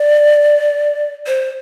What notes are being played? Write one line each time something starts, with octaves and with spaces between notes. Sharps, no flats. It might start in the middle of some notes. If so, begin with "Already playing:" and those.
Already playing: D5
C5